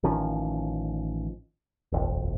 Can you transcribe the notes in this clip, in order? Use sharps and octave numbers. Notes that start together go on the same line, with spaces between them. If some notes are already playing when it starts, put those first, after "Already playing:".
A1 D#3 F3 C#4
D#1 G#1 F2